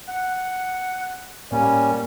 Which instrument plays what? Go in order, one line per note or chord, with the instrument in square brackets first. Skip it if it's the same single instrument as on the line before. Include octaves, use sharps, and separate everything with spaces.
[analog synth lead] F#5
[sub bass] A2 [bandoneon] G3 C#4 [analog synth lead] A#3